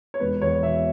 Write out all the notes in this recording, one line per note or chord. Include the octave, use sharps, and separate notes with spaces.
C#5
E1 B4
E2 C#5
B2 E5